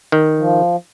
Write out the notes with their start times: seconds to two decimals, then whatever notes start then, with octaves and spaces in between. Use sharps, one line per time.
0.12 D#3
0.38 F3